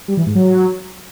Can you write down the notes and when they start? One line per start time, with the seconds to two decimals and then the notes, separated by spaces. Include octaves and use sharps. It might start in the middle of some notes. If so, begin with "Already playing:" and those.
0.08 G3
0.17 E3
0.26 G#2
0.35 F#3